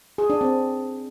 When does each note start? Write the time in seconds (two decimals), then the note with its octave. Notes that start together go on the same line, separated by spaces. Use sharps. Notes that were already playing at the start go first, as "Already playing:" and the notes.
0.18 G#4
0.30 D4
0.41 C4